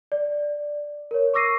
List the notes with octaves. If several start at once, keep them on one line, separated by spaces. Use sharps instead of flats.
D5
A#4 C#5
C#6 D6 E6 A#6 C7 D#7